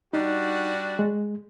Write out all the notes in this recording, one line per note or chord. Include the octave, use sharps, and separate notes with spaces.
G3 D4 D#4 F#4
G#3